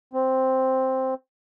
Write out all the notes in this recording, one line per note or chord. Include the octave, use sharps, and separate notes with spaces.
C4